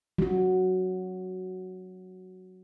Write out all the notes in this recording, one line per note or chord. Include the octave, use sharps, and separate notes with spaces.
F#3 F#4